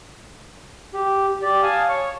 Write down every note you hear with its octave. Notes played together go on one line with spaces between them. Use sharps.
G4
G4 D5
F5 G#5 A5 D#6
C#5 C#6